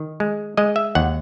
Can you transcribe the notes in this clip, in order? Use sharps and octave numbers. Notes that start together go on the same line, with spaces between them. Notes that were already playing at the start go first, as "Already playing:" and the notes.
Already playing: D#3
G#3
G#3 D#5
E5
D#2 F#5